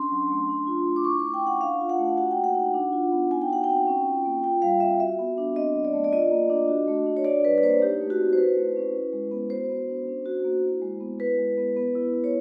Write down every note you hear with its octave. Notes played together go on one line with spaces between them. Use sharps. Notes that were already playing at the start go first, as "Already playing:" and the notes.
Already playing: C#4 D4 C6
F#3
A3
D4
F4
A3
D6
E4 C#6
A3 C#6
G5
C#4 F#5
D4 F5
F4
F#5
A3
F#4 F#5
G5
A#3
F#5
D#4
D4
F4
B3
D#4 G#5
G5
F#4 F#5
C4 G5
C#4
F4
A#3
F4 G5
G3 F5
C4 E5
F#4 E5
B3
D4
C4 D#5
F#3
D5
A3
D5
F4 D#5
A#3
D4
F#4
A3
D4
C#5
D4 D5
G3 B4
B4
A#3 C5
D#4 G4
A3
F#4
C4
C5
E4 B4
A3
C#4
E4
G#3
B3
F#4 C5
B3
D4
C#4
F#4
A#3
E4
G#3
B3
E4 B4
G#3
B3
B3
E4
E4
C#5